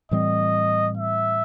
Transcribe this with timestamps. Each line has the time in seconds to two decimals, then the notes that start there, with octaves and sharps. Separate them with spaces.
0.11 A2 E3 G3 C4 D#5
0.97 E5